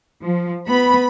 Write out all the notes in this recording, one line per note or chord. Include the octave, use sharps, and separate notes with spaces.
F3
B3 B5